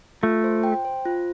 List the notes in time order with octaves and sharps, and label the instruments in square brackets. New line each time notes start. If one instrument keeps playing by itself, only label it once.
[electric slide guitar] A3 [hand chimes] F4
[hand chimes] C5
G5
C5
F4